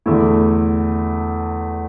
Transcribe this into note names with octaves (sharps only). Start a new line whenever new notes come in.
E2 D3 A3 E4